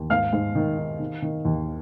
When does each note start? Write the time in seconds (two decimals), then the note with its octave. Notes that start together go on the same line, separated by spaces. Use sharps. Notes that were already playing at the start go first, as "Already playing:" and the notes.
Already playing: D#2
0.10 G#2 F5 F6
0.33 G#2
0.55 D#3
0.78 D#4
1.00 D#3
1.22 D#3
1.45 D#2